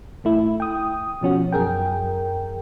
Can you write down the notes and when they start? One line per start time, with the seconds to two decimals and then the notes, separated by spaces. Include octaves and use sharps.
0.24 A1 A3 E4
0.60 G5 D#6
1.21 B2 F3 C#4 F#4
1.52 F#2 G#4 A#4 G5